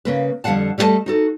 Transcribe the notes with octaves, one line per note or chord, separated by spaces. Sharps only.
C#3 A#3 B4
F2 D3 G3 F5 F#5 A5
G3 A3 D#4 A#4 D#5 A5
D#4 F#4 A4